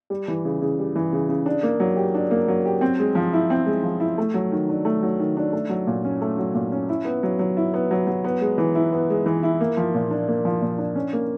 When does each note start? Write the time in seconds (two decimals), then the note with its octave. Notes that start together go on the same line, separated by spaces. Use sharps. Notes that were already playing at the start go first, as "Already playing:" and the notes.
0.10 G3
0.28 E3
0.45 C#3
0.62 C#3
0.79 G3
0.95 E3
1.13 C#3
1.29 C#3
1.46 D4
1.63 A#3
1.80 F#3
1.96 G4
2.15 D4
2.31 A#3
2.48 F#3
2.65 G4
2.81 C4
2.99 G#3
3.15 F3
3.33 E4
3.50 C4
3.66 G#3
3.83 F3
4.00 E4
4.18 A3
4.34 F#3
4.52 D#3
4.69 D4
4.85 A3
5.03 F#3
5.20 D#3
5.37 D4
5.53 A3
5.69 F#3
5.87 A#2
6.05 C#4
6.22 A3
6.38 F#3
6.55 A#2
6.72 C#4
6.89 E4
7.05 B3
7.23 F#3
7.39 F#3
7.57 E4
7.74 B3
7.91 F#3
8.07 F#3
8.24 B3
8.41 G#3
8.58 E3
8.75 E4
8.93 B3
9.10 G#3
9.26 E3
9.43 E4
9.61 A#3
9.77 F3
9.94 A#2
10.10 D4
10.28 A#3
10.45 F3
10.62 A#2
10.78 D4
10.95 C#4
11.13 A#3